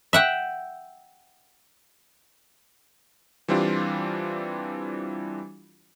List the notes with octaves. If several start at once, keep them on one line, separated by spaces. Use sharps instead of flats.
E5 F#5 G5
E3 G3 C4 D4 F4 G4